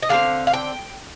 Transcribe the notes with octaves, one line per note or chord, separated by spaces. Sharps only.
D#5
D3 G#3 C4 F5
F5
G5